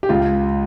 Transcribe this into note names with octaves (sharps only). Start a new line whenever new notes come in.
G4
C#2 F4